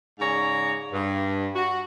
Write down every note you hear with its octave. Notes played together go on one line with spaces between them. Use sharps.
G#2 C#3 G#4 C#5 D5 A#5
G2
F#4